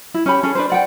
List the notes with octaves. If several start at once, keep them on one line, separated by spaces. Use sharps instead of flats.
E4
C#4 G4 B5
C#4 G#4 A4
D4 B4 C5
D5 F#5 G5